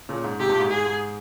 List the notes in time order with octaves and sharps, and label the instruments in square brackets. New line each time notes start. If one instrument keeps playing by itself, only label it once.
[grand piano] A#2 C#3
G#2
[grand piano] G#2 C3 [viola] G4
[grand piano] G2 A#2
G#2
[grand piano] G#2 [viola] G#4
[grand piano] G#2